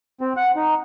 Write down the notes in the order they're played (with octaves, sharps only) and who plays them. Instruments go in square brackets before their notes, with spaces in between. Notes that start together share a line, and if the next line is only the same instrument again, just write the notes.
[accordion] C4
F#5
D#4